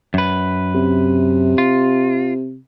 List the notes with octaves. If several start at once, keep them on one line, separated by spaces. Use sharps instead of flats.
F#2 B4
C3
F4